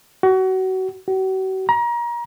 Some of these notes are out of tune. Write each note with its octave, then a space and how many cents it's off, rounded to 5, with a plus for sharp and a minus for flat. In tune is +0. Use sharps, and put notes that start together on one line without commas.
F#4 +25
F#4 +40
A#5 +30